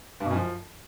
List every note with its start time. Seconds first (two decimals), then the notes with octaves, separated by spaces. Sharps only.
0.20 G2
0.26 B2
0.31 F#2
0.36 F3